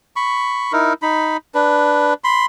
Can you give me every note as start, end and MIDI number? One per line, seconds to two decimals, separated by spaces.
0.16 0.72 83
0.16 0.72 85
0.72 0.93 63
0.72 0.93 64
0.72 0.93 70
1.02 1.37 63
1.02 1.37 83
1.55 2.14 62
1.55 2.14 71
2.24 2.46 83
2.24 2.46 84